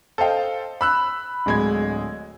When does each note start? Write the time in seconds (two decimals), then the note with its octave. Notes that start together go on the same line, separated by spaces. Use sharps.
0.18 A4 C5 D#5 F5 G5
0.81 B5 E6 F#6
1.46 D1 G#3 G#6